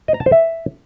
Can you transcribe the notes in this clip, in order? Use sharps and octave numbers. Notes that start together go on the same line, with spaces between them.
D#5
A#5
A5
C5
E5